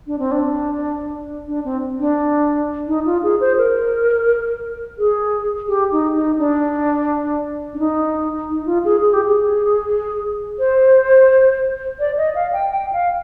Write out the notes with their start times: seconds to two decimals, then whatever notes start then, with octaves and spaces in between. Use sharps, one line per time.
0.07 D4
0.19 C4
0.32 D4
1.48 D4
1.65 C4
2.00 D4
2.88 D#4
3.06 F4
3.23 G#4
3.41 C5
3.58 A#4
4.99 G#4
5.68 G4
5.92 D#4
6.15 D#4
6.39 D4
7.74 D4
7.79 D#4
8.50 D#4
8.66 F4
8.85 G#4
9.02 G#4
9.13 G4
9.25 G#4
10.59 C5
12.00 D5
12.17 D#5
12.35 F5
12.53 G5
12.70 G5
12.93 F5